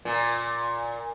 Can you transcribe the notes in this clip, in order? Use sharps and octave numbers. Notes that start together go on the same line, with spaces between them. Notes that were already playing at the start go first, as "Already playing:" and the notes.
A#2